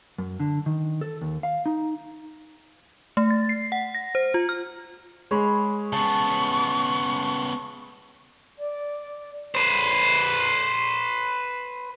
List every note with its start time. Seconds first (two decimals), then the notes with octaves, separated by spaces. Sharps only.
0.19 F#2
0.40 D3
0.66 D#3
1.01 A4
1.21 D#2
1.43 F5
1.66 D#4
3.17 A3
3.30 A6
3.49 C7
3.72 F#5
3.95 A#6
4.15 C5
4.34 F4
4.49 F6
5.31 G#3 C#5 B5 C6
5.93 C#3 B3 A5 C#6
8.58 D5
9.55 B4 C5